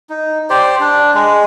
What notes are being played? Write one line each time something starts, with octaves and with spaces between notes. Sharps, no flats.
D#4
G4 C5 D5
D4
G#3